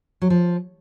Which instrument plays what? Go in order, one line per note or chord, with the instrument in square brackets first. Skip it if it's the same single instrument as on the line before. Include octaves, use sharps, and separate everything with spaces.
[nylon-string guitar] F#3
F3